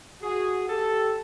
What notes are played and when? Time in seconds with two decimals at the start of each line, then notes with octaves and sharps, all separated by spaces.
0.22 F#4 G#4
0.68 G4 A4